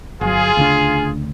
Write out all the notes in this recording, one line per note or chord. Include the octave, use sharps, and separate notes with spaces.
G1 F#3 F4 G#4
D2 C#3 D4